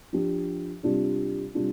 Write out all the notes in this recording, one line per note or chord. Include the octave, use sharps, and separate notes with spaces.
F3 D4 G4
C3 G3 D4 F4
C3 G3 D4 F4